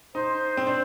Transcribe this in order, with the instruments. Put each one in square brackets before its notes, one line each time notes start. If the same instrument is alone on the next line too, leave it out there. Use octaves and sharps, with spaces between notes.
[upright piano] D#4 [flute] C5
[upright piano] C4
D4